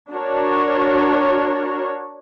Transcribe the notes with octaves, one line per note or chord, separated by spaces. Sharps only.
D4 F#4 A#4 C#5